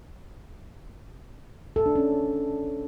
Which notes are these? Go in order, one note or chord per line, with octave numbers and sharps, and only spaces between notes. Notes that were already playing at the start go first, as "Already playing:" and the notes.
A4
D4
C#4